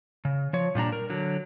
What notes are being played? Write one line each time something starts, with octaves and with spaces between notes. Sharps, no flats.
C#3
F3 C#5
A#2 G3 D4 A#5
A#4
D3 F#3